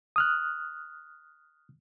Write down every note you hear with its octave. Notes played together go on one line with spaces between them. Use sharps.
D#6 F6 F#6